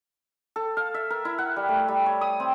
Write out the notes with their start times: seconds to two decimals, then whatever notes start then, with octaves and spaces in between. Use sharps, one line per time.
0.56 A4
0.77 F5
0.94 E5
1.10 A#4
1.25 E4
1.38 F#5
1.56 G3
1.69 A3
1.88 G3
2.06 C#5
2.21 D#6
2.40 C4